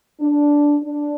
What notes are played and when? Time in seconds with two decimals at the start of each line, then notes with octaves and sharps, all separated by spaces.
0.21 D4
0.83 D4